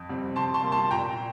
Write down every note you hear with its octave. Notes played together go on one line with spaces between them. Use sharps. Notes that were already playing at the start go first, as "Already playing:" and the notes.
Already playing: F2
C3 G3 C4
C3 A5 C6
A5 C6
G3 A#3
A5 C6
A#2 G5 A#5